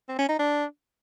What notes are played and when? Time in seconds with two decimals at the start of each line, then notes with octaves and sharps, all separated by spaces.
0.09 C4
0.19 C#4
0.29 D#4
0.39 D4